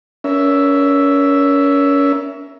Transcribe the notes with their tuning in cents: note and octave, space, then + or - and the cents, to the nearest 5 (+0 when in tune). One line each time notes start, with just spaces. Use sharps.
C#4 +30 A#4 +20 E5 +0